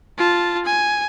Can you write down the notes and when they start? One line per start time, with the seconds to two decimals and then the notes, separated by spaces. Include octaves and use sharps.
0.18 F4 A5
0.65 G#5